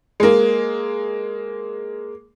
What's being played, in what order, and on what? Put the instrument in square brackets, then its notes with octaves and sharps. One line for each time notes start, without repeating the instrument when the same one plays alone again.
[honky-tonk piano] G#3 A#3